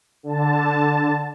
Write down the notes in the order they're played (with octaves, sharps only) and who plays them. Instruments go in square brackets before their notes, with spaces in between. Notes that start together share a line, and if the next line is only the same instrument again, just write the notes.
[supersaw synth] D3 A5